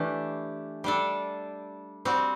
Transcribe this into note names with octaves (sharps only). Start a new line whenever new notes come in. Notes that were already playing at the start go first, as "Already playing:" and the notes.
Already playing: E3 A3 D4 G4
G3 D4 A4
G3 C4 F#4